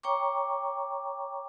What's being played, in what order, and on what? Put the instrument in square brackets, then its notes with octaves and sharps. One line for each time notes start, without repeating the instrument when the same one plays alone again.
[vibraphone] C#5 G5 A#5 C#6 D6